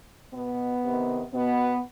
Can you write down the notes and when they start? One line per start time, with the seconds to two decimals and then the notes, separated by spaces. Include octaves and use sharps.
0.32 B2 B3
0.83 C3 D#3
1.32 B2 B3